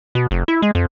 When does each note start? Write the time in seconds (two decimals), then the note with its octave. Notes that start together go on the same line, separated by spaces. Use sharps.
0.15 B2
0.31 F1
0.48 E4
0.62 G#3
0.75 F2